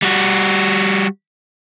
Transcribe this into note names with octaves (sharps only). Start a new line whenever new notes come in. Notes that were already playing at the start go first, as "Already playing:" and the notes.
G3 F#4